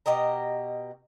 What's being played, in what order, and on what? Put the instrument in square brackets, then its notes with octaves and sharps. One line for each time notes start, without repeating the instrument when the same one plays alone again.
[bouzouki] B2 G4 D#5 A#5